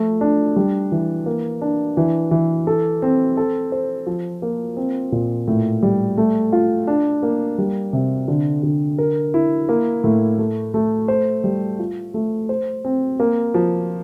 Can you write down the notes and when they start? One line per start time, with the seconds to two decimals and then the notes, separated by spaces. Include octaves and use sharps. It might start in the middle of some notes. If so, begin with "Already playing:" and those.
Already playing: F3 A3
0.21 D4
0.56 G3
0.92 E3
1.26 A#3
1.61 D4
1.97 E3
2.31 E3
2.67 A4
3.02 C4
3.37 A4
3.72 C5
4.06 F3
4.42 A#3
4.77 C4
5.12 A#2
5.47 A2
5.83 G3
6.18 A3
6.53 F4
6.87 D4
7.23 A#3
7.58 G3
7.93 C3
8.28 D3
8.63 D3
8.98 A#4
9.34 E4
9.69 A#3
10.04 A2
10.38 A3
10.74 A3
11.08 C5
11.44 G3
11.79 F4
12.14 A3
12.49 C5
12.84 C4
13.20 A#3
13.54 F3